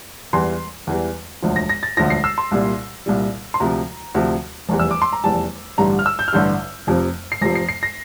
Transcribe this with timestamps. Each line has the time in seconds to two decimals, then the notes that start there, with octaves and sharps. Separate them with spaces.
0.33 E2 E3 G3 C6
0.87 E2 E3 G3
1.42 E1 D2 D3 F3
1.56 A#6
1.69 A#6
1.83 A6
1.97 E1 D2 D3 F3 A#6
2.10 C7
2.24 E6
2.38 C6
2.51 C2 A#2 G3
3.06 C2 A#2 G3
3.54 C6
3.60 D2 C3 F3 A#5
4.15 D2 C3 F3
4.69 F1 E2 E3 G3
4.79 E6
4.91 D6
5.02 C6
5.13 A#5
5.24 F1 E2 E3 G3 A5
5.78 A1 G2 D3 G3 A#5
5.99 F6
6.06 E6
6.19 G6
6.28 F6
6.32 A1 G2 D3 G3 G6
6.87 F1 F2 C3 F3
7.32 C7
7.41 F1 F2 C3 F3 A#6
7.55 C7
7.69 C7
7.83 A#6